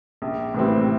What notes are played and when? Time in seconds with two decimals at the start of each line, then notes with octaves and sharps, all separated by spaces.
0.22 A#1
0.54 A2 E3 G3 C4